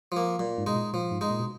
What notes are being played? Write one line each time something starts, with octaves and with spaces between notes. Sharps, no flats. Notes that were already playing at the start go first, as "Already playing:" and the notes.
F3 A#3
A#2 F#3
G#2
B2 G#3 D#4
A#2
A#2 F3
G#2
G#3 D#4
A#2
B2